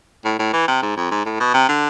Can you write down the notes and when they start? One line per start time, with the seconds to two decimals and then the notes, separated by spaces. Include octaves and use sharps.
0.25 A2
0.40 A2
0.53 E3
0.68 C3
0.83 G#2
0.97 F2
1.11 G#2
1.26 A2
1.40 B2
1.54 C3
1.69 D3